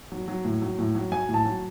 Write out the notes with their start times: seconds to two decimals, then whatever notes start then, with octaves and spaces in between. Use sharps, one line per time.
0.12 F#3
0.28 F#3
0.45 A2
0.62 F#3
0.79 A2
0.95 F#3
1.12 F#3 G#5
1.29 A2
1.34 A5
1.45 F#3